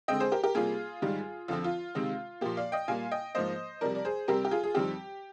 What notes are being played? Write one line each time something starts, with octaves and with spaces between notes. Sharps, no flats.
D3 G#3 C4 D#5 G5
G#4 C5
G4 A#4
G4 A#4
C3 G3 A#3 F4 G#4
G#2 D#3 G3
F2 D3 F3 C4 F4
F4
C3 D#3 G#3 C4
A#2 F3 A#3 G4
D5 F5
D#5 G5
A#2 G3 A#3 F5 G#5
D#5 G5
G#2 F3 A#3 C5 D#5
F2 C3 G3 A#4 D5
D5
G#4 C5
C3 G3 C4 G4 A#4
G4
F4 G#4
G#4
F2 D#3 G3 C4 G4